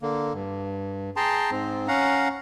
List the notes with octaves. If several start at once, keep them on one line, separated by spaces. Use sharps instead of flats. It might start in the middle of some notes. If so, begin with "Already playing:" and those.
D3 A#3
G2
G#4 G5 A5 A#5 C6
G#2 C4
C#4 F5 F#5 A#5